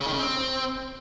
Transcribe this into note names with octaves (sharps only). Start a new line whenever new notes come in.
C#3
D#3
C#3
C4